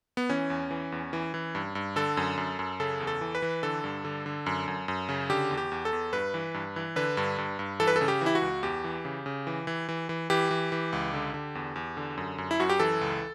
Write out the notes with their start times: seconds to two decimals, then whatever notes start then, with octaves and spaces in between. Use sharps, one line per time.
0.17 B3
0.30 E3 C#4
0.50 E2
0.71 E3
0.92 E2
1.13 E3
1.34 E3
1.55 G2
1.75 G2
1.96 D3 A4
2.17 F#2
2.37 F#2
2.59 F#2
2.80 C#3 A4
3.00 E2
3.07 A4
3.21 E3
3.35 B4
3.42 E3
3.63 D3 A4
3.84 G2
4.05 D3
4.26 D3
4.46 F#2
4.68 F#2
4.88 F#2
5.09 C#3
5.30 D3 G4
5.51 E2
5.57 G4
5.72 E2
5.85 A4
5.93 E2
6.12 G2 B4
6.34 E3
6.54 G2
6.76 E3
6.96 D3 B4
7.17 G2
7.38 G2
7.59 G2
7.80 E3 A4
7.87 B4
7.96 A4
8.01 C#3
8.08 G4
8.21 E3 E4
8.35 F#4
8.42 C#2
8.63 E2 G4
8.84 E3
9.05 C#3
9.26 C#3
9.47 E3
9.67 E3
9.89 E3
10.09 E3
10.30 E3 G4
10.51 E3
10.72 E3
10.93 C#2
11.13 D3
11.34 D3
11.55 E2
11.76 E2
11.97 D3
12.18 F#2
12.38 F#2
12.51 E4
12.59 F#2 F#4
12.70 G4
12.80 E3 A4
13.01 C#2